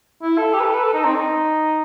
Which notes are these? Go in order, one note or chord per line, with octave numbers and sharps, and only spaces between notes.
E4
A4
G4
B4
A4
B4
A4
D#4
C4
D#4